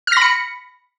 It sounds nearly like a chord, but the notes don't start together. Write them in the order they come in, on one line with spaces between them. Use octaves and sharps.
F6 A#6 B5 C#7